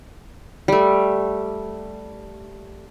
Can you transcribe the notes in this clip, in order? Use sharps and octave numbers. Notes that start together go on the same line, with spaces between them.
G3 A3